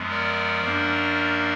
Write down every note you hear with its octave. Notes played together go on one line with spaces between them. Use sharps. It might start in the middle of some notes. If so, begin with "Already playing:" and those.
Already playing: F#2 F3 G#3 B3
A#4 D5
F#2 F3 A#3 D4